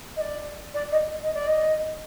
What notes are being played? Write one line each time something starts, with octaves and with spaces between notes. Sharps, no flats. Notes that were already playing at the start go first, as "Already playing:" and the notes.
D#5
D5
D5
D#5
D#5
D5
D#5